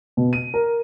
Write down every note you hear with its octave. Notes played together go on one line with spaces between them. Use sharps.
B2
D#7
A#4